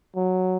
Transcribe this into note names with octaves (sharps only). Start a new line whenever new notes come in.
F#3